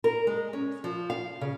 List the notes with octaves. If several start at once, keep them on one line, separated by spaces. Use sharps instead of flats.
A#4
G#3
C#4
F3
F5
C#3